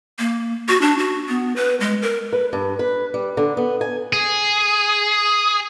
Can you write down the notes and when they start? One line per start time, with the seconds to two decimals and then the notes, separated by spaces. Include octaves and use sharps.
0.19 A#3
0.69 F#4
0.81 D4
0.99 F#4
1.28 B3
1.56 B4
1.80 G#3
2.02 A#4
2.33 B4
2.53 G2
2.79 B4
3.14 G3
3.37 D3
3.57 B3
3.81 G#5
4.13 G#4